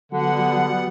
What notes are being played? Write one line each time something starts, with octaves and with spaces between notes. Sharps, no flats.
D3 F#3 G3 B3 F#5